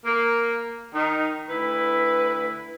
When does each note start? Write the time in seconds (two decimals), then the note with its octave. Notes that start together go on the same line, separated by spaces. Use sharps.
0.06 A#3
0.94 D#3 D#4
1.49 D2 E4 B4